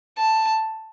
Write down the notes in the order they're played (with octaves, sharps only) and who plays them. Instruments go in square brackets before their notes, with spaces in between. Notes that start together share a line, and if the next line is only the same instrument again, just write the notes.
[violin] A5